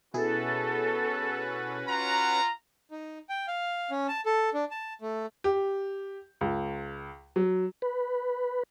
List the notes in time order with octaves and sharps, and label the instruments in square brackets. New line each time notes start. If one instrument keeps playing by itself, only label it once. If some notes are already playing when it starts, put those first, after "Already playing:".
[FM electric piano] B2 E4 G#4 [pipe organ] C#4 F#4 B4 [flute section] A4
[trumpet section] F4 F#5 A#5
[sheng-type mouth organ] D#4
G5
F5
C#4
A5
A4
D4
A5
A3
[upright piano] G4
C#2
F#3
[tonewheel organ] B4